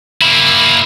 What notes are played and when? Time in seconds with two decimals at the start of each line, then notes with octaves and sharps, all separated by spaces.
0.22 A#3 E4